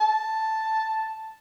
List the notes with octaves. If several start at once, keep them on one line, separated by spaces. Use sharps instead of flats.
A5